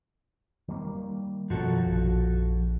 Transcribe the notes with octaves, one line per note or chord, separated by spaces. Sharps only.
D#3 G3 A#3
F#2 B2 D#3 F3 F#4 A4
A#1